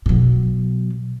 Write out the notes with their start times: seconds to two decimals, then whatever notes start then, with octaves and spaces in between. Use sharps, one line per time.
0.06 B2 F#3